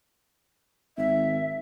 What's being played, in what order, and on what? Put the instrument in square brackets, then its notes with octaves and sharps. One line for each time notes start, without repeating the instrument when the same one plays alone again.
[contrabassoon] G#1 [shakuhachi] E5